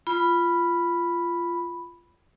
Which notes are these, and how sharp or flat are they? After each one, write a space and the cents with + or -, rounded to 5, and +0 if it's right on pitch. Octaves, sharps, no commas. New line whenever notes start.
F4 -15 B5 +0